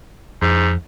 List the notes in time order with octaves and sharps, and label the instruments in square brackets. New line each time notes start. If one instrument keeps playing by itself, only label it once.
[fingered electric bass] F2 [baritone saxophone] G#2